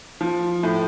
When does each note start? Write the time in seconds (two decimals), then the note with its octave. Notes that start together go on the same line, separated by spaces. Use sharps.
0.21 F3
0.63 A2